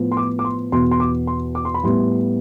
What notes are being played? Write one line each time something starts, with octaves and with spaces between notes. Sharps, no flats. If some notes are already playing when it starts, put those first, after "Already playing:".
Already playing: A2 F3 B3
C6
D6
D6
C6
E2 B2 B3 C6
C6
D6
C6
D6
C6
B5
A2 G3 B3 C6